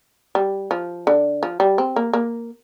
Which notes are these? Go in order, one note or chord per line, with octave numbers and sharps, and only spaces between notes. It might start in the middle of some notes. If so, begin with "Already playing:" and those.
G3
F3
D3
F3
G3
C4
A#3
A#3